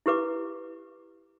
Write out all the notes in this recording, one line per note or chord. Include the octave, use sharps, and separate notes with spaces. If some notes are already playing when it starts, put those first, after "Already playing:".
E4 G4 B4 D6